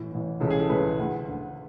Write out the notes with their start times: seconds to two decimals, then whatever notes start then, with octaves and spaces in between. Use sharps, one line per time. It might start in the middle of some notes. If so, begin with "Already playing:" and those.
Already playing: A1 A2 E3
0.12 A1 A2 E3
0.40 C#2 C#3 E3 A4
0.50 G#4
0.60 A4
0.69 C#2 C#3 E3 B4
0.98 D2 D3
1.28 D2 D3